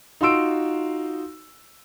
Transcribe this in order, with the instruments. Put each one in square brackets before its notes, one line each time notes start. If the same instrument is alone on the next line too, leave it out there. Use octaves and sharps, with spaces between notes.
[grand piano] D#4 F4 F#4 C6 E6 D7